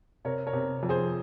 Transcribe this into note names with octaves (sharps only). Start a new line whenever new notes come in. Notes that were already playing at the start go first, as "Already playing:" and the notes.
C3 A#4 C#5
A#4 C#5
C3
F2
G#4 C5